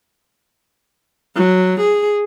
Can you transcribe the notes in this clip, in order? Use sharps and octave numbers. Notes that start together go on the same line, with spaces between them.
F#3
G#4